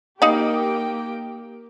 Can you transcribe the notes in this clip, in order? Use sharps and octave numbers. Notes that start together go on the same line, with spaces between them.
A#3 D#4 G4 F5 G5 B5